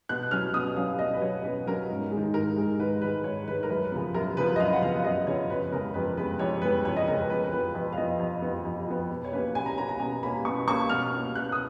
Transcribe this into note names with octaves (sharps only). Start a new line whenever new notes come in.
B2 F#6
F#3 C#4 F6
B2 D#6
F#3 C#4 F5
B2 D#5
B4
F#3 C#4 C#5
B2 B4
F#3 C#4 A#4
G#2
G#3
D#3
G#2 A#4
D#3 G#3
G#2 B4
D#3 G#3 B4
G#2 C#5
D#3 G#3 B4
A#4
F#2 B4
C#3 F3 B3
F#2 A#4
C#3 F3 B3 B4
D#5
F#2 F5
F#5
C#3 F3 B3 F5
F#2 D#5
C#3 F3 B3 C#5
F2 B4
C#3 G#3 B3 A#4
F2 B4
C#3 G#3 B3 B4
F2 C#5
C#3 G#3 B3 B4
F2 C#5
D#5
C#3 G#3 B3 A#4
B4
F2 B4
F3 B3 B4
F2 B4
F5
F3 B3 D#5
F2
F3 B3
F2
F3 B3
B2
C#5
A#3 C#4 B4
B2 G#5
A#5
A#3 C#4 A#5
A#5
B2 G#5
A#3 C#4 B5
B2 C#6
A#3 C#4 C#6
B2 F6
A#3 C#4
B2 F#6
D#6